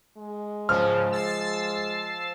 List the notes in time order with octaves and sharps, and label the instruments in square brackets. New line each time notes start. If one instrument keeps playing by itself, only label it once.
[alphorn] G#3
[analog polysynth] G#2 C#3 [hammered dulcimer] F3 [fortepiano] F6
[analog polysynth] E6 A6 C7